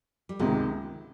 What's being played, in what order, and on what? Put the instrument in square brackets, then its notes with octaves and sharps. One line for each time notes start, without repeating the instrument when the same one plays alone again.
[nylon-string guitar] G3
[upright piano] C#2 C3 D#3 [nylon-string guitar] G#2 G#3